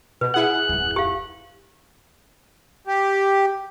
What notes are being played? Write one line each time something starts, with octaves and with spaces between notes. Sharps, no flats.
B2 B4
E4 G#4 F#5 F#6
D1 F2
G4 F5
G4